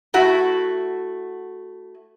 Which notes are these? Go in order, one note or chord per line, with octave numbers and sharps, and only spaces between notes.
A3 E4 F#4